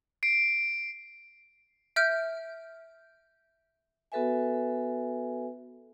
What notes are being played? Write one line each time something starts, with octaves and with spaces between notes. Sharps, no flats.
C7 D7
E5 F6 G6 D7
B3 F#4 A4 B4 E5 G#5